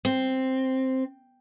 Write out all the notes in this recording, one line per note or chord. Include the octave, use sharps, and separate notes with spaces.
C4